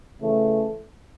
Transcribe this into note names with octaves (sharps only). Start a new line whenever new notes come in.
C#3 E3 A3